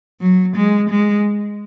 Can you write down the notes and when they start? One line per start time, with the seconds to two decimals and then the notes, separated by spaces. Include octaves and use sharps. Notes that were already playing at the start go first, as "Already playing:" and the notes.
0.21 F#3
0.57 G#3
0.90 G#3